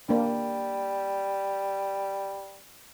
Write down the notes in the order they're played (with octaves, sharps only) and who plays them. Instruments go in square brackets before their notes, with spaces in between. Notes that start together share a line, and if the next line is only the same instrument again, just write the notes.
[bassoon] G3 [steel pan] A#3 D4